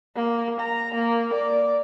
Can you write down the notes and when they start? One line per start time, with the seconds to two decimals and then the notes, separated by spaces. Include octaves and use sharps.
0.16 A#3
0.60 A#5
0.94 A#3
1.33 D5